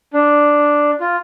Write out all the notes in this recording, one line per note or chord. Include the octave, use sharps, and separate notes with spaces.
D4
F4